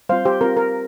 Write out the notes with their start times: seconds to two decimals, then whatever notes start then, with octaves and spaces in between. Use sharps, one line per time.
0.09 G3 C4 F4 C5 F5
0.25 G4 C5
0.41 C4 F4 A#4
0.57 A#4